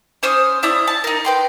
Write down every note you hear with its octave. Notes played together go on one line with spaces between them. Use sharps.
C#4 C5 D#6 F6
D4 E4 C#5 D#6
A5
D#4 A#4
B4 G5 C6